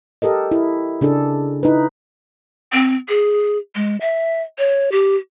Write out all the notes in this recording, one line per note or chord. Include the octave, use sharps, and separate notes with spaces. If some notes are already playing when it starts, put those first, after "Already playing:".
G4 A4 A#4 D#5
E4
C#3 D4 G#4 A4
D#4 E4 B4
C4
G#4
G#3
E5
C#5
G4